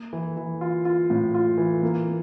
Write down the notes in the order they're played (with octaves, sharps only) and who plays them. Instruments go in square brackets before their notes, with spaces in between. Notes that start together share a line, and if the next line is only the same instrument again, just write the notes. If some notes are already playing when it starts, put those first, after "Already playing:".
Already playing: [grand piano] A#3
E3
E3
F4
F4
A2
F4
E3
A#3
A#3